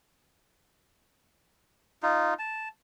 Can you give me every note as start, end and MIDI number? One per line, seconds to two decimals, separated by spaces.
2.03 2.34 63
2.03 2.34 65
2.39 2.69 81